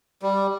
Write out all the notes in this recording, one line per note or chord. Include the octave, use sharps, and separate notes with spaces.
G3